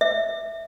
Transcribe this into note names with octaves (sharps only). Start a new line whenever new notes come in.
E5